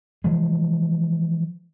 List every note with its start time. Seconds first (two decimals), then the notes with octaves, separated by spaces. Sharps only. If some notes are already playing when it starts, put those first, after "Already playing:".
0.24 E3 F3 G#3